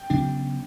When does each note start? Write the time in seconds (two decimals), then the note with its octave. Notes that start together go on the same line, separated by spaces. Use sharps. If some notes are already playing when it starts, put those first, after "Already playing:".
Already playing: G5
0.10 C#3 F#3 B3 D4